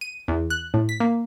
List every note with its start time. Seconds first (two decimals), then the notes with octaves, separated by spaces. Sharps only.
0.01 D#7
0.28 E2
0.50 F#6
0.74 A2
0.89 B6
1.00 A#3